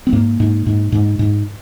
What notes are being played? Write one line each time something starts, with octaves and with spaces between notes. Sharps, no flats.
C4
G#2 A#3
G#2
G#2
G#2
G#2